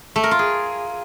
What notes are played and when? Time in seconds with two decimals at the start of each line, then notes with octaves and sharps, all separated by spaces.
0.16 A3
0.23 A#4
0.31 F4
0.39 G#4